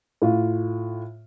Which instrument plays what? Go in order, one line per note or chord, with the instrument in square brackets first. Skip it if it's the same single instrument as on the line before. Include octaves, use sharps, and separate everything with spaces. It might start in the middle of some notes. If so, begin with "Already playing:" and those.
[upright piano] A2 F4